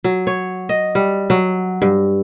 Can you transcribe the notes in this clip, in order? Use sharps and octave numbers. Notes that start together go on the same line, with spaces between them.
F#3
C#5
D#5
G3
F#3
G2